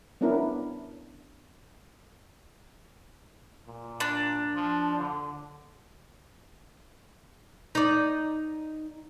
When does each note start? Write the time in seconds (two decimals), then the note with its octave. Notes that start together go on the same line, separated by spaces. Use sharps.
0.21 B3 C#4 D4 E4 A#4
3.67 A#2
4.00 D4
4.55 F3
5.00 D3
7.75 D#4 D5